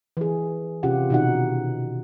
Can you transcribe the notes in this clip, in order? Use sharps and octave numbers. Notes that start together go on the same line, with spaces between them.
E3 G#4
C3 C#4 F4 G4 F#5
B2 D#3 D#4 F#4 F#5